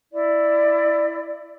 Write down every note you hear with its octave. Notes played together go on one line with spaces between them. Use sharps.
E4 D5